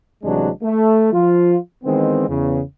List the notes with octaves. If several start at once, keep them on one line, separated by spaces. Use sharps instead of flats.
A1 C3 E3 F#3 G#3 D4
A3
F3 F4
D#3 E3 G#3 B3 C4
E2 C#3